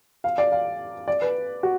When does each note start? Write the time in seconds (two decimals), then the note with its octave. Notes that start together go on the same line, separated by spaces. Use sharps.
0.24 F5
0.38 D5
0.52 F5
1.08 D5
1.22 B4
1.63 F#4